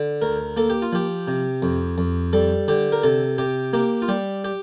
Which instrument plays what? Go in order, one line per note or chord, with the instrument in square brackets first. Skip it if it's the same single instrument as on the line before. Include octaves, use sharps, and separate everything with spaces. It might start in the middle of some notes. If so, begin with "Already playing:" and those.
Already playing: [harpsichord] D3
D2 A#4
A#3 A4
G4
F4
F3 G4
C3
F2
F2
G3 A4
D3 G4
A#4
C3 A4
C3 G4
A#3 G4
F4
G3 G4
G4